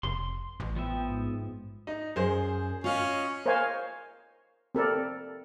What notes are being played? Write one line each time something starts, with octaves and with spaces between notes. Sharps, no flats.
F1 C6
A1
F3 B3 E5 G5
G#2
D#4
F#2 G#4 C5
C#4 F4 D#5
A#4 C5 C#5 D#5 F5 G#5
C4 A4 A#4 D5